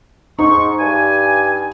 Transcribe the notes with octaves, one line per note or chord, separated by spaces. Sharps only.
G#2 D#4 C#6
G2 G#5